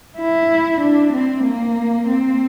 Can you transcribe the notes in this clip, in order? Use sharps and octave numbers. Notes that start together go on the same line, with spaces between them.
E4
D4
C4
A#3
C4